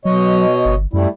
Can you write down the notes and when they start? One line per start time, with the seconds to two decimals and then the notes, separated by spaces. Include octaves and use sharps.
0.05 B2 F#3 C#5 D#5
0.65 G1
0.93 F#2 G3 A3 E4